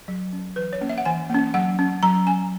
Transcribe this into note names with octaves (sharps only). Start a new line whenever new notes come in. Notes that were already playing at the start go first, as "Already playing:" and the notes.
F#3
C#4
E3 B4
C#5
A#3 C#4
E5
F#5
E3 G#5
A#3 C#4
F#3 F#5
C#4
F#3 A#5
C#4 G#5